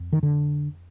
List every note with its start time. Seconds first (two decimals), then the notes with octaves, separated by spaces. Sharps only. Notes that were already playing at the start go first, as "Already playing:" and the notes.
Already playing: F2
0.13 D#3
0.23 D3